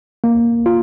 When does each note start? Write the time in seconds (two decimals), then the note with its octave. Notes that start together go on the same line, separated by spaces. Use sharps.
0.24 A#3
0.66 F4